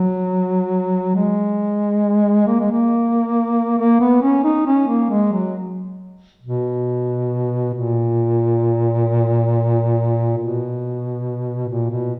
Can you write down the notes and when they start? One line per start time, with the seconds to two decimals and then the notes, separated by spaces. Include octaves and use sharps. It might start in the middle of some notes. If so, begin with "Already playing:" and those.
Already playing: F#3
1.16 G#3
2.47 A#3
2.60 G#3
2.72 A#3
3.79 A#3
4.01 B3
4.22 C#4
4.44 D#4
4.67 C#4
4.88 A#3
5.10 G#3
5.32 F#3
6.42 B2
7.74 A#2
10.37 B2
11.69 A#2
11.91 B2